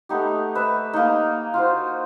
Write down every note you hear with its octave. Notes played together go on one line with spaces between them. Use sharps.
A3 B3 D#4 G4
B4 E5
A#3 D#4
F4 F#4 C5